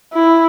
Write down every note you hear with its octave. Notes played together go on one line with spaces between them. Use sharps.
E4